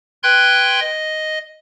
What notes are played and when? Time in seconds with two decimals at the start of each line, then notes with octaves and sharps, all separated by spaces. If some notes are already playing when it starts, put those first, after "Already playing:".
0.23 B4 G5 C6 F#6 G#6
0.80 D#5